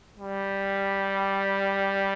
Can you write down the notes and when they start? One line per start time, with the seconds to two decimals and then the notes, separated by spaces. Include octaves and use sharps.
0.18 G3